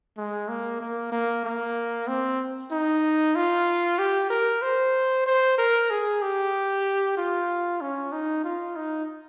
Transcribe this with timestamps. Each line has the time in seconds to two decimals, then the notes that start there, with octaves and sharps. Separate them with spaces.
0.17 G#3
0.48 A#3
0.80 A#3
1.12 A#3
1.44 A#3
2.08 C4
2.71 D#4
3.35 F4
3.99 G4
4.30 A#4
4.62 C5
5.26 C5
5.58 A#4
5.90 G#4
6.22 G4
7.17 F4
7.81 C#4
8.12 D#4
8.44 F4
8.77 D#4